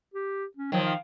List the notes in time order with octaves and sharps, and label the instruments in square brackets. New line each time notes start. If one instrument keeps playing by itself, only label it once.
[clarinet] G4
C#4
[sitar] D#3 F3 [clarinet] F#3
[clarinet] F5